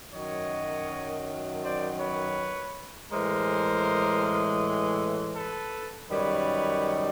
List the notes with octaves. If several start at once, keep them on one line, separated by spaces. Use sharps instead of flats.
F#2 D#3 F#3 C#5 D#5
C5 D5
B4 C#5
A2 E3 G#3 A#4 C5
A4 B4
F#2 D#3 G3 B4 C#5